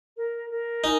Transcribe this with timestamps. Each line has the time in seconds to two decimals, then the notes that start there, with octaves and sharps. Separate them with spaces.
0.17 A#4
0.50 A#4
0.84 D#4 G#5